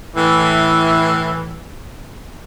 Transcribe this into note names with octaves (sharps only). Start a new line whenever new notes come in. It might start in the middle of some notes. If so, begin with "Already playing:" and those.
A2 E3